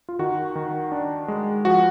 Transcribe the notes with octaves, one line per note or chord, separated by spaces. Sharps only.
F4
D#3 F#4
D#3
D4
G#3
F3 F#4